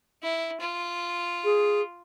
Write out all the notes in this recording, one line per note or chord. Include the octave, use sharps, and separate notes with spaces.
E4
F4
G#4